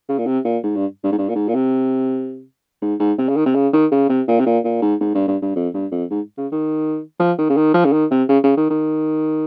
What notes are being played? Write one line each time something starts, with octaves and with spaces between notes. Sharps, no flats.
C#3
A#2
C3
A#2
G#2
G2
G2
G#2
G2
A#2
G#2
A#2
C3
G#2
G#2
C3
C#3
D#3
C3
C#3
D#3
C#3
C3
A#2
C3
A#2
A#2
G#2
G#2
G2
G2
G2
F2
G2
F2
G#2
C#3
D#3
F3
D#3
C#3
D#3
F3
C#3
D#3
C3
C#3
C#3
D#3
D#3